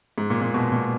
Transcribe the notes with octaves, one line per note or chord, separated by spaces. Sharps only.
G#2
A#2
A#2
B2
A#2